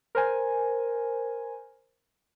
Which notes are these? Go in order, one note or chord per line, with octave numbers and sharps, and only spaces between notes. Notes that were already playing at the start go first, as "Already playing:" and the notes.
A#4 C5 G#5